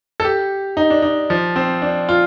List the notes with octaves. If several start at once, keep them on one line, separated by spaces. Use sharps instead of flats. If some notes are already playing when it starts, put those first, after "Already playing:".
A4
G4
D#4
D4
D#4
F3
C4
D4
F4